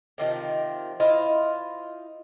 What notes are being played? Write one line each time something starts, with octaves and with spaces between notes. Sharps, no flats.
C3 D#3 F3
E4 F4 C5 D#5